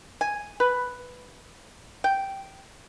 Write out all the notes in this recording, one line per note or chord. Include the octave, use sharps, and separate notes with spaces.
G#5
B4
G5